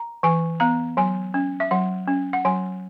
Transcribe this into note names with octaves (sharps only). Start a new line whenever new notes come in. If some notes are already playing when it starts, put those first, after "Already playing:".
Already playing: A#5
E3 G#5
B3 A#5
F#3 G#5
C#4
E5
F#3 F#5
C#4
F#5
F#3 G#5